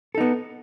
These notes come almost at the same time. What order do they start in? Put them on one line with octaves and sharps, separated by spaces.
A4 D#4 B3